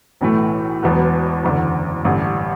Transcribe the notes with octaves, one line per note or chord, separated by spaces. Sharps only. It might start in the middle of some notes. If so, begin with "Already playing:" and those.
B1 A2 E3 A3
E1 E2 B2 F#3 B3
F#1 E2 D3
A1 G2 D3